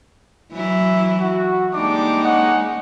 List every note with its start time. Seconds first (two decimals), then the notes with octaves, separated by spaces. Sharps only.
0.53 E3 F#3 E4
1.20 F#4
1.75 G3 G#3 A#3 D4 D#4 D6
2.23 C#4 D#5 F#5